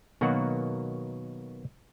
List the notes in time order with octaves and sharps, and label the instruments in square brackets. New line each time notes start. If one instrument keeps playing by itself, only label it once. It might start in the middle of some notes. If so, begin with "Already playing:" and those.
[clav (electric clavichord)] B2 D#3 F#3 A#3 F#4 F#5